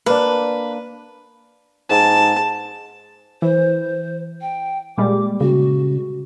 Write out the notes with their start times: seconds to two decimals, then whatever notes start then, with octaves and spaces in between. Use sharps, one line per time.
0.06 A#3 D4 B4
1.90 G#2 A5
3.42 E3 C5
4.42 G5
4.98 A#2 G3 G#3 D6
5.41 C#3 F#4